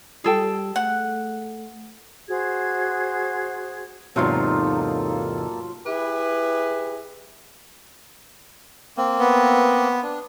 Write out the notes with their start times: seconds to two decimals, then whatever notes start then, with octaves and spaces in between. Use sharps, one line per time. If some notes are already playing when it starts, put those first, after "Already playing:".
0.24 G3 G#4 A4 G5
0.76 A3 F#5
2.29 F#4 G#4 C5 G#6
4.16 E2 G#2 C3 F#3 A#3 D#4 F4 A4
5.85 E4 G4 G#4 B4
8.97 A#3 C4
9.19 B3
10.03 D4